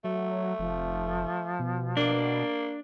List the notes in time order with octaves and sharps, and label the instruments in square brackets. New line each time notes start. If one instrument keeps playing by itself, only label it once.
[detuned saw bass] F#3 [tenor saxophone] A3
[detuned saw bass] F1 [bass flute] F3
[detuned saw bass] B2
[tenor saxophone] A#3 [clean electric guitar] D4